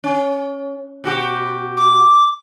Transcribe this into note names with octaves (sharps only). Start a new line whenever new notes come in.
C#4
B2 F#4 G4
D6